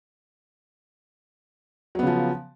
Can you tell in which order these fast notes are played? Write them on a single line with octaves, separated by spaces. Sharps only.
F#3 B3 C#3 F3